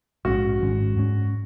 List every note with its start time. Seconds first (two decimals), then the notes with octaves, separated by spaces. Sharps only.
0.25 A#1 G#2 G#3 C#4 F#4
0.61 G#1 G#2 G#3 C#4
0.97 G#2 G#3 C#4